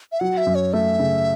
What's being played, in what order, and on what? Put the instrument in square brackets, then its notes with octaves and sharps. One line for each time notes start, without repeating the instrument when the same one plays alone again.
[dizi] E5
[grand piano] F#3 [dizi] F#5
[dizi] E5
[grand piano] F#2
[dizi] C#5
[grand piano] A3 [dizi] E5
[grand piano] C#3